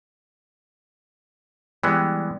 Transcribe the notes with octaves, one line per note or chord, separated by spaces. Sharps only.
E3 G3 G#3 B3